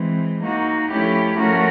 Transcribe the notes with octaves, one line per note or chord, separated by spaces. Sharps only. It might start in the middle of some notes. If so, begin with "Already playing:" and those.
Already playing: E3 G#3 C4
A#3 D#4 F#4
F3 A3 C#4 E4 G4
F3 A3 C#4 F#4 A#4